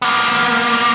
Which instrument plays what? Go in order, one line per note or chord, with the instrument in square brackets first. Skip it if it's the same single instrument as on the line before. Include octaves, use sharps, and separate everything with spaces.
[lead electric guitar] A#3 B3